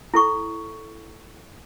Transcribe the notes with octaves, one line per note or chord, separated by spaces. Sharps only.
E4 A4 C#6